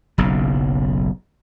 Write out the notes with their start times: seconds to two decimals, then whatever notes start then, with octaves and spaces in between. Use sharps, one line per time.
0.18 F#1 B1 C#3